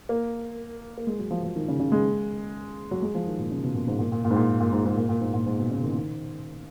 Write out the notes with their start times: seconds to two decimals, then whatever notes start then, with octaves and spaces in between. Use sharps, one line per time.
0.09 A#3
0.97 A#3
1.07 G#3
1.19 F#3
1.31 F3
1.43 F3
1.56 D#3
1.68 C#3
1.80 C#3
1.92 G#3
2.91 F#3
3.02 G#3
3.15 F3
3.27 D#3
3.38 A#2
3.51 C#3
3.64 B2
3.75 A#2
3.87 G#2
3.99 A#2
4.12 A#2
4.25 A#2
4.31 G#2
4.36 A#2
4.60 A#2
4.73 G#2
4.86 G#2
4.97 A#2
5.09 A#2
5.21 G#2
5.34 A#2
5.46 G#2
5.59 B2
5.71 C#3
5.83 D#3
5.95 D#3